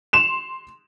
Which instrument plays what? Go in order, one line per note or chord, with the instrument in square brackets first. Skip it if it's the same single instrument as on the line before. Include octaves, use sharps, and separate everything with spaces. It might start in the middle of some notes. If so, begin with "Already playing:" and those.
[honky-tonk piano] C6 E7 F7